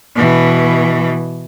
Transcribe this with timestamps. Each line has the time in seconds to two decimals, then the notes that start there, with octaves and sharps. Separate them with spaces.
0.16 B2 E3